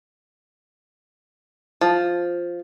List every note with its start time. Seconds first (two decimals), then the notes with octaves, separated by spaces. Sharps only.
1.81 F3